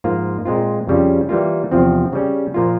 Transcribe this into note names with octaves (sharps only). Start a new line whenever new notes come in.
G#2 F3 A#3 F4
A#2 G#3 C4 F4
F2 C#3 G3 C#4 F4
E3 G3 A#3 F4
E2 C3 F3 C4
C#3 G3 C#4
A#2 F3 A#3 F4